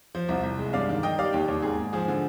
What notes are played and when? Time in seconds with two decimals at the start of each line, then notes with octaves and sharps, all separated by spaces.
0.15 F3
0.29 C2
0.43 C2
0.59 G#3
0.73 G2 D5 F5
0.89 D#3
1.03 D#3 D#5 G5
1.18 G3 D5 F5
1.33 D#2 G4
1.48 D#2
1.62 G#2 G#4
1.78 G#2
1.93 F3 G#4
2.08 D3